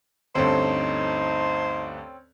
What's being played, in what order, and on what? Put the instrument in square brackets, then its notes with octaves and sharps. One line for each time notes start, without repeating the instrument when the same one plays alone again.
[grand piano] D2 G2 [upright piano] C4 C#4 A4 [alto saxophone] D#4 [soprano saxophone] C5